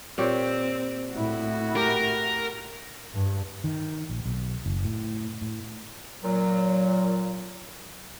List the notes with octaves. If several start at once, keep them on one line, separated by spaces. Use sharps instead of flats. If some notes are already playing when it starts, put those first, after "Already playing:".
A#2 C4 G4 C#5
A2 E4 F#4
G4 A#4
G2
D#3
A#1
B1
F#1
A2
A2
A#2 F#3